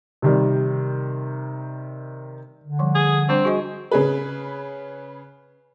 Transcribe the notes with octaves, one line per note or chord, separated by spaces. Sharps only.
C3 D#3 G3
D3
F3 G3
G#4
G3 C4 D4 C5
F#4 G#4 D#5
C#3 G#4 B4